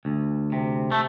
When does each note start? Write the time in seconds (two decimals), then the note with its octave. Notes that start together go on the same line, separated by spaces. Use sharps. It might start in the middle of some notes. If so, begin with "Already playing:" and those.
0.05 D2
0.52 C3
0.92 A3